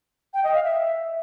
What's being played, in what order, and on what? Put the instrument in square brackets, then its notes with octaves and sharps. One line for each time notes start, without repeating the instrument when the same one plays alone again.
[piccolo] G5
D#5
F5
E5